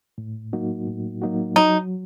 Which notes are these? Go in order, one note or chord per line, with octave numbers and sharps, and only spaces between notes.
A2
F#3 A#3 D#4 F#4
A2
F#3 A#3 D#4 F#4
F#3 D#4